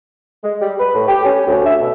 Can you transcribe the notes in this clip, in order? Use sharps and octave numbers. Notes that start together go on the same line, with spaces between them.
G#3
G3
B4
A2
G4
C#4
D2
E5
B2